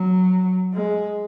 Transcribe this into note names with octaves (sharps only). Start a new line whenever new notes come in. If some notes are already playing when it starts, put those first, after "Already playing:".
Already playing: F#3
G#3